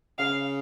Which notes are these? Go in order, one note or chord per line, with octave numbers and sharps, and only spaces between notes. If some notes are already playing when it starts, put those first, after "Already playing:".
C#3 F5